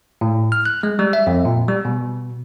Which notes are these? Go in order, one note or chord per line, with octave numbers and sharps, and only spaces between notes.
A2
F6
F#6
G#3
G3
E5
F2
A#2
G3
B2